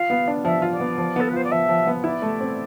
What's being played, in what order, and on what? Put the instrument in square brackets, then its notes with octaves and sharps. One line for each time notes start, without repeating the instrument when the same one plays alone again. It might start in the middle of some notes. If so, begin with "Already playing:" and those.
Already playing: [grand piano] F4 [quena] F5
[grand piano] B3
D4
[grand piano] F3 [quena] E5
[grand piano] F4
[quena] D5
[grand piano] B3
F3
[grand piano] B3 [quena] A4
[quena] B4
[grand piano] F4 [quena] C5
[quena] D5
[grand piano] F3 [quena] E5
[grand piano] F3
B3
[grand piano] E4 [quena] D5
[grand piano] A3
C4